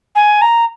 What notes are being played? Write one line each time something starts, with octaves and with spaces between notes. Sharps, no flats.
G#5
A#5